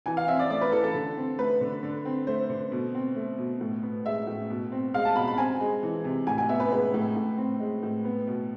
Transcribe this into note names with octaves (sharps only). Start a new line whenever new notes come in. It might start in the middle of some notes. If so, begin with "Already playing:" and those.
E3 G#5
F5
C4 E5
D5
A3 D5
B4
E3 A4
A4
D3
C4
A3 B4
D3
D3
C4
A3 C5
D3
B2
C4
A3
B2
A2
B3
G#3 E5
A2
B2
C4
G#3 F5
A5
B2 B5
B5
C4 G#5
G#3
E3
C3
A2 G#5
G#5
B3 E5
B4
G#3 B4
A2
A2
C4
G#3
A2
B3
B2